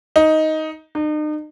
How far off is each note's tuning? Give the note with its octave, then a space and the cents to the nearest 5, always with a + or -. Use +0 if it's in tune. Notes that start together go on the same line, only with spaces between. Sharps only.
D#4 +10
D#4 -40